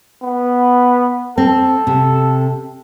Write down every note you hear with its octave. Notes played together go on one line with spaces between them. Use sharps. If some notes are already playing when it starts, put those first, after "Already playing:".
B3
C4 A4
C3